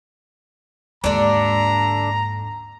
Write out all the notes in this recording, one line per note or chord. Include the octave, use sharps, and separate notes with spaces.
D#2 G#2 D3 D4 A#5